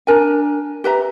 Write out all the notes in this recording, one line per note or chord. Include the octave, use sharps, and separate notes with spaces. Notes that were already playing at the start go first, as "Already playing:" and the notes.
D4 A#4 G#5
G4 B4 E5 A#5